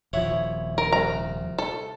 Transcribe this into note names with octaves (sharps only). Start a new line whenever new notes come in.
D#1 F3 E4 C#5 F#5
A#4
C2 A#5
A4